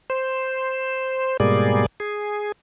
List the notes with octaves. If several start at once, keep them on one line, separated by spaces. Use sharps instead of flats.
C5
G#2 B2 G3 A#3 G#4 D5
G#4